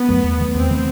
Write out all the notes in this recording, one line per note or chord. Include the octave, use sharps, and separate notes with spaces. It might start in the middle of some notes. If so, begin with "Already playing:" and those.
Already playing: B3
F#2 F#3 A3
E2
D#3 A3
E2 C4
D#3 A3